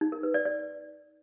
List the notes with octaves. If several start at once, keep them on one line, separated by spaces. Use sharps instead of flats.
D#4
A#4
B4
D5
D5